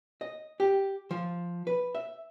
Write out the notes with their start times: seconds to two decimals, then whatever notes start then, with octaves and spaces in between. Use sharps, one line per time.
0.21 D#5
0.60 G4
1.11 F3
1.67 B4
1.95 E5